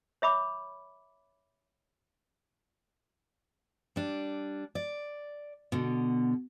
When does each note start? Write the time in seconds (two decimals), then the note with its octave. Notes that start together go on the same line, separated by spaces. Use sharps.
0.22 C#5 E5 B5 D6
3.96 G3 D4
4.75 D5
5.72 B2 D3